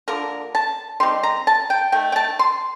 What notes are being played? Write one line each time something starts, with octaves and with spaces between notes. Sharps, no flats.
D3 F3 A#3 A#4
A5
G3 C4 D#4 C6
A#5
A5
G5
D#3 A3 G5
G5
A5
C6